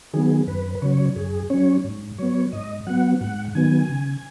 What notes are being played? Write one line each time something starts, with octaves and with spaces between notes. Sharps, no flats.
D#3 F#3 B3 G#4
F#2 B4
B4
C#3 F#3 C#5
F#2 G#4
F#3 C#4 C#5
G#2
F#3 B3 C#5
G#2 D#5
F#3 B3 F#5
G#2 F#5
D#3 F#3 B3 G#5
C#3